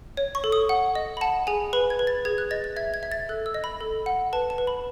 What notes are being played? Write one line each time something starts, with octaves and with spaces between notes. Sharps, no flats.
C#5
C#6
A4
D#6
F#5
D#5
B5
F#5 A5
G#4 G#5
B4 B5
G#6
B4
A6
G#4 G#6
F#6
D#5 A6
A6
E5 G#6
G#6
E5
A6
A4 F#6
E6
D#5
B5
A4
F#5
B4 A5
A5
B4
B5